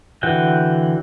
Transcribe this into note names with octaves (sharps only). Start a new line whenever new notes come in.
D3 E3 F#4 G5